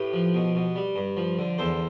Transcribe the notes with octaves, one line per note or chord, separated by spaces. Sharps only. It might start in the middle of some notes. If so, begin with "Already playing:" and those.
Already playing: A2 G4 B4
F3
B2
B2
G3
G2
F3
D3
E2 A4 C5